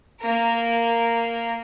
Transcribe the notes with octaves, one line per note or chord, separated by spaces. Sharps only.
A#3 A#4